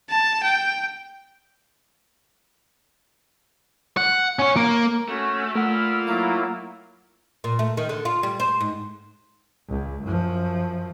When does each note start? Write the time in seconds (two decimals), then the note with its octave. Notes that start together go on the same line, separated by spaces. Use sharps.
0.10 A5
0.43 G5
3.97 F#5
4.39 C#4 C#5
4.57 A#3
5.08 A3 C#4 F#4
5.55 A3 F4 A#4 F#5 B5 E6 F6
6.07 F#3 A#3 E4 A6 C7 D7
7.44 A#2
7.59 A3
7.77 D#3
7.89 D3
8.05 F4
8.23 G3
8.40 C5
8.61 G#2
9.68 C#2
10.02 F#2 F3